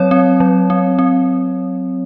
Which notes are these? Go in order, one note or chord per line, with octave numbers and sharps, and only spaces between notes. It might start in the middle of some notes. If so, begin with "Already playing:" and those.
Already playing: F#3 C4 C#5
C4
F#3
C4
C4